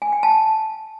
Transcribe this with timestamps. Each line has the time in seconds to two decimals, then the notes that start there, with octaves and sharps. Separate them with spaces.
0.02 G#5
0.12 G5
0.23 A5